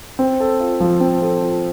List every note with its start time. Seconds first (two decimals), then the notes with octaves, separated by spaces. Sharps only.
0.19 C4
0.40 A4
0.60 F4
0.80 F3
1.00 C4
1.22 A4
1.41 F4